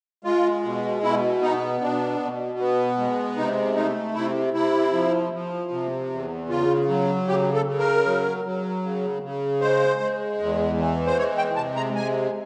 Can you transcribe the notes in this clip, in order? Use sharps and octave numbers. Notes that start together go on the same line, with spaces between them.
G#3 F4
B2
B2 E4
B3 D#4
B2 D4
B2
B3
G#3
C3 D#4
A3 D#4
C3 E4
C3 E4
F3
F3
C3
E2
C#3 F4
F#3
C#3 G4
A4
C#3
A#4
F#3
F#3
C#3
C#3
G#3 C5
G#3
E2
E3
C5
G#3 C#5
G5
C3 A5
A#5
G#3 G#5